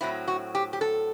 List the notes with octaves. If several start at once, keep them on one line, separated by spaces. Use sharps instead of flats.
A2 F#3 C4 E4
F#4
G4
G4
A4